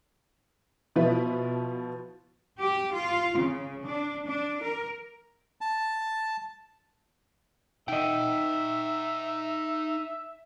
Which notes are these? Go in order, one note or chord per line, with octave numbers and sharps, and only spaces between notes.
B2 F3 E4 B4
G4
F4
C#3
D4
D4
A#4
A5
D#4 D#5 E5 F#5 G5